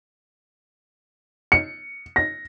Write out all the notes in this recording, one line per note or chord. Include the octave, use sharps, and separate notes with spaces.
C#7
A#6